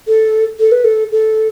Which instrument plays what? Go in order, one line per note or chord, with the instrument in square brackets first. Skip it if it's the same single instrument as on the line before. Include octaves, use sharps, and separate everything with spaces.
[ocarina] A4
A4
B4
A4
A4